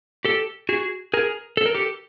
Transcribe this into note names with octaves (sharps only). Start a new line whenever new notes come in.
G4 A4
F#4 G#4
G#4 A#4
A4
A#4
G4 A4